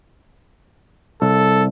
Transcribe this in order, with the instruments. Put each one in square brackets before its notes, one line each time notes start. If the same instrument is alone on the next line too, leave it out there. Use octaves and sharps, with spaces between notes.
[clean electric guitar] C2 [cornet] A4